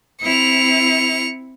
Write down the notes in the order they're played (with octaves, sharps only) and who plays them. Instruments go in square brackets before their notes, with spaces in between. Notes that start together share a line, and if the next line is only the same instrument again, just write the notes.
[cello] C4 E4 [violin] C#7 F7